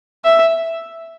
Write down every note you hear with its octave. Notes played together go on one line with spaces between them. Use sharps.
E5